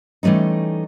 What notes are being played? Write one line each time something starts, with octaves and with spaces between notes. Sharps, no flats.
E3 G3 A3 C#4 D#4